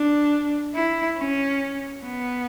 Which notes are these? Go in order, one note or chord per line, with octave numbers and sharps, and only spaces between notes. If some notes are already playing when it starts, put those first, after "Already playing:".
Already playing: D4
E4
C#4
B3